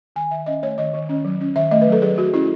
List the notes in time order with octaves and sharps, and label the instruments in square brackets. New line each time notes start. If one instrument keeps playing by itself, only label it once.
[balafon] D#3 G#5
D#3 E5
C#4 D#5
A3 C#5
D#3 D#5
D#3
C#4
F#3
C#4
D#3 E5
A3 D#5
B4
F#3
A4
F#3 G#4
F#3 F#4
C#4 E4